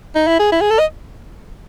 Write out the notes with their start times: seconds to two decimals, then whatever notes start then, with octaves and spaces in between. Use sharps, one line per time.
0.15 D#4
0.27 E4
0.40 G#4
0.52 E4
0.61 G#4
0.71 A4
0.79 D#5